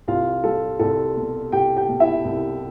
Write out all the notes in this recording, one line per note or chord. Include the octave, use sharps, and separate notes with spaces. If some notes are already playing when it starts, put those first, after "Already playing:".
C2 F4 F5
G3 A4
C2 A4
B2
C2 G4 G5
G4 G5
B2
E4 E5
C2